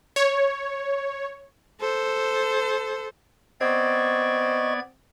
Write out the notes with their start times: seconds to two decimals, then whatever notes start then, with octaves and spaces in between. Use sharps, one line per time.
0.16 C#5
1.81 A4 C5
3.61 B3 C4 D5 D#5 C#6 G#6